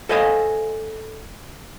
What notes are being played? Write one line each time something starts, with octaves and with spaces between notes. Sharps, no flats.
A4 C5 D#5 F5 G#5